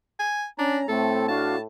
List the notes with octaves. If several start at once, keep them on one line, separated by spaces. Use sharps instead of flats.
G#5
C#4 D4 A#5
A2 A3 C4 A4
D4 F#4 F5 A5